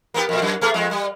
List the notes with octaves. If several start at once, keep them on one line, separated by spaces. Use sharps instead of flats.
A#3 B3 G4
F2 A#2
F#2
A3 B3 G#4
F2 G#3
G3